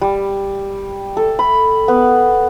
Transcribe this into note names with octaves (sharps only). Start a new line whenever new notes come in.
G3
A4
B5
B3